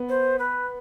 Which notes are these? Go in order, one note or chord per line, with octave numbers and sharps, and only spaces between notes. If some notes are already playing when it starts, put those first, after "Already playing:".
Already playing: B3
C5
B4